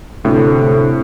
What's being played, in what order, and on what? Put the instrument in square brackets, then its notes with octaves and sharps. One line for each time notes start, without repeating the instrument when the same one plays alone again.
[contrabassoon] D2 [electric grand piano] A2 [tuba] C3 [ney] A4